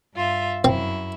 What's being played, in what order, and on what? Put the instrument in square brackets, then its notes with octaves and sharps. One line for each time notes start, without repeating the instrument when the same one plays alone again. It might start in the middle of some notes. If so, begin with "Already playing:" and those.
[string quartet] G2 F4 E5
[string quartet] F#2 E4 [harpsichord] C4